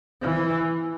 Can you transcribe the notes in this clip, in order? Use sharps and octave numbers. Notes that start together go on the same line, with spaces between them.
E3